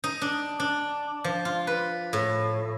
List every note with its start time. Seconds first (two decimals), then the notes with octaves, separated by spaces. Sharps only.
0.04 D#4
0.21 D4
0.60 D4
1.24 F3
1.45 F4
1.67 B4
2.13 A2